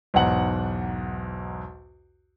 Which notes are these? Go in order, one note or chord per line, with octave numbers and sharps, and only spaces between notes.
B1 E2 G#2 F#5 F#7